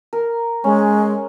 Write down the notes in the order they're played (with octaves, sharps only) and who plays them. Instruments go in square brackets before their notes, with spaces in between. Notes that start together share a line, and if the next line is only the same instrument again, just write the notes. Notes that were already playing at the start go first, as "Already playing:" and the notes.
[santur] A#4
[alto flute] G#3 [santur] C#4